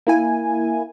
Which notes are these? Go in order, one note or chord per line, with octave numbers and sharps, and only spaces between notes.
A#3 E4 G#5